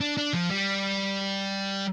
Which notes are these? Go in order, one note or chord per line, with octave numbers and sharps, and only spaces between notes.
D4
D4
F3
G3